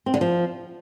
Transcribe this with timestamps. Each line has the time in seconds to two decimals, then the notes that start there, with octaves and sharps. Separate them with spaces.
0.06 C4
0.14 D3
0.21 F3